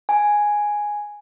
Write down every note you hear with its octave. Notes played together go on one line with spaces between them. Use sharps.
G#5